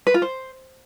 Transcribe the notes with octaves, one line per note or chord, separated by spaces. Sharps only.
B4
F4
C5